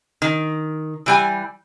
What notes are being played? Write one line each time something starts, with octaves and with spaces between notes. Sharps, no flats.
D#3
E3 G3 G#5